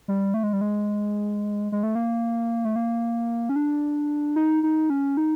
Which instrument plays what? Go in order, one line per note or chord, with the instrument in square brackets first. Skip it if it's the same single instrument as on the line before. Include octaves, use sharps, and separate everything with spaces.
[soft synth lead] G3
A3
G#3
G3
G#3
G#3
A3
A#3
A3
A#3
C#4
D4
D#4
D#4
C#4
D#4